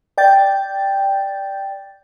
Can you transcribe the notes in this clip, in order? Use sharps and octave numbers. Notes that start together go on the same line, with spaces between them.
D5 G5 G6 A6